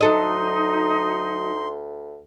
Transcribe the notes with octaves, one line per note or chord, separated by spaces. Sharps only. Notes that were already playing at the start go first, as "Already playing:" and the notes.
D2 F#3 D#4 A4 D#5 C6